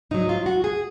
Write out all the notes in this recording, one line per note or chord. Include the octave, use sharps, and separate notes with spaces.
G#2 F#3 D#4
F4
F#4
G#4